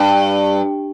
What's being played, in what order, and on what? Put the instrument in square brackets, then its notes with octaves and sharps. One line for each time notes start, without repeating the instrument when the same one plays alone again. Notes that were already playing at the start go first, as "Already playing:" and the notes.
Already playing: [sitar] G2